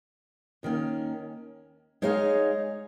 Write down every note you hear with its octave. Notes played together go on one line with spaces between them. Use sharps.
D#2 D#3 A#3 C#4
G#3 D#4 G#4 C#5 F5